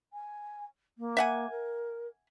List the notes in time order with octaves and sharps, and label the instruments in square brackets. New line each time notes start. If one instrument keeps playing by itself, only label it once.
[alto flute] G#5
A#3
[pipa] E5 F#5 G#5
[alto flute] A#4